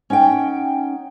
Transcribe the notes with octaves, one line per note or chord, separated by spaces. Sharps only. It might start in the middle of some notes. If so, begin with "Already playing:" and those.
C#4 D#4 F#5 G5